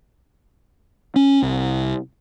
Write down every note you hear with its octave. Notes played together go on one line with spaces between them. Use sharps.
C#4
C2